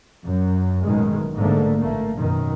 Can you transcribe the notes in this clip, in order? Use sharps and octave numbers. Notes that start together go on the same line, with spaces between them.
F#2
A1 F#2 B2 D#3 G#3
G#2 D3 A3 A#3
A1 A3 A#3
F#2 B2 D#3